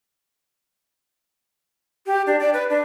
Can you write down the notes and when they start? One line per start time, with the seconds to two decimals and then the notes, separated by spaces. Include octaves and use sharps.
2.07 G4
2.27 D4
2.40 D5
2.53 B4
2.70 D4